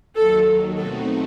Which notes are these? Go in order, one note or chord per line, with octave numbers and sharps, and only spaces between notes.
D#2 D#3 F#3 A4
B2 A3 C4 D#4 F#4 A4